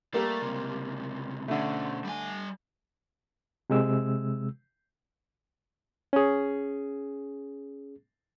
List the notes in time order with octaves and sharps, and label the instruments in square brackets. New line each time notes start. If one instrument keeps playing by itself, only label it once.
[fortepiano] G3 A#3 G4 [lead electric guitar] A3
[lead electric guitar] C#2 C3
[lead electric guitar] B2 C#4 [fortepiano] D3 A3
[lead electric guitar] G3 G#5
[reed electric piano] C3 G#3 E6
C#4 G#4